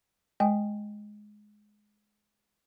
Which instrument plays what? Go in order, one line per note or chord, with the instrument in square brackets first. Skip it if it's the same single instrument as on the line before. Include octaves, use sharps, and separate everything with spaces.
[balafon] G#3 G5 G#5